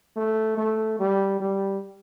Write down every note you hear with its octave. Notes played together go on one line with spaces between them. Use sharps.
A3
A3
G3
G3